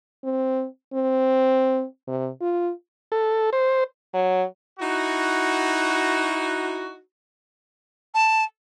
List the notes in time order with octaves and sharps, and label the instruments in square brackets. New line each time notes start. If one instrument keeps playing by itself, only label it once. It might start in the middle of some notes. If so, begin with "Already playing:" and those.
[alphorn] C4
C4
C3
F4
[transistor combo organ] A4
C5
[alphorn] F#3
[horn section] D#4 E4 F#4
[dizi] A5